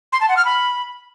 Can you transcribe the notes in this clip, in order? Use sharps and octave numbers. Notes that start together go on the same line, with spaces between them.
C6
A5
F#5
F6
B5